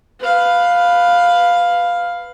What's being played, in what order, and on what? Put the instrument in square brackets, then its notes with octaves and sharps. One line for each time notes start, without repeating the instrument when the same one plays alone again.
[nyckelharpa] B4 F5